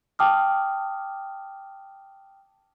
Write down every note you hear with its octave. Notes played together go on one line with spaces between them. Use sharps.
G5 A5 D6 D#6 F6